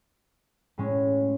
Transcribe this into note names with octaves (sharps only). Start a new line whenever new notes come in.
A2 G#3 C#4